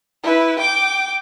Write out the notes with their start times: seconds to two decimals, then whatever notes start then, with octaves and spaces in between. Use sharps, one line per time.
0.23 E4 B4
0.59 G5 D6